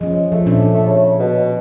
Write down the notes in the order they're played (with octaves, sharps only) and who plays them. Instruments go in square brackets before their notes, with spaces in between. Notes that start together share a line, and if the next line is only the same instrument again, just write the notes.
[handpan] F3 C#4 [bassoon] G#3
[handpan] F3 [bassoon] A3
[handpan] A#2 C#4 D4
[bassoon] A3
C#3
B2